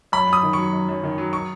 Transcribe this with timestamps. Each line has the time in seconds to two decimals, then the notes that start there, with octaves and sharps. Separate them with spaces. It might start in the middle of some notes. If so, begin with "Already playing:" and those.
0.12 F#2 B5
0.28 F#2
0.33 D#6
0.43 D#3
0.53 F#3 C#6
0.73 F#2
0.89 F#2
1.04 D#3
1.18 F#3
1.33 C#6